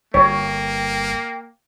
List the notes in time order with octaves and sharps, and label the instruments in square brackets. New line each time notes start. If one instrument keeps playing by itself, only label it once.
[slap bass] G1 [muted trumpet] A#3 [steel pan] C#5 [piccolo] G5